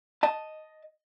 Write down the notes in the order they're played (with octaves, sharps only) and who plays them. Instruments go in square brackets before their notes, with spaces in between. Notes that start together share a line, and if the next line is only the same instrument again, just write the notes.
[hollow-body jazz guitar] D#5 A5